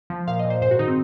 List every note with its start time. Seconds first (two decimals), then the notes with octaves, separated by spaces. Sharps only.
0.10 F3
0.27 A#2 F5
0.39 D#5
0.45 A#2
0.50 C5
0.62 G#2 C5
0.71 F#4
0.79 D#3 D#4
0.88 C4